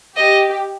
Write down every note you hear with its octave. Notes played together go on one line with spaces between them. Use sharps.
G4 D#5